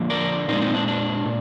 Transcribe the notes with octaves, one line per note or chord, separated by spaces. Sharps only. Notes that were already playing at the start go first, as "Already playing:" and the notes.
Already playing: D3 F3 A#3
A#4 D5
A#2 C4 D#4
G#3
C4 D#4
D4
D4
A#2